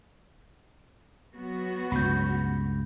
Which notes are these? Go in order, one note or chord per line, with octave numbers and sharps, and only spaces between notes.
F#3 B3 F#4
C#2 G2 C#3 B5 G6